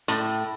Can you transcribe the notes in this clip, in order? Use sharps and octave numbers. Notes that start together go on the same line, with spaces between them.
A2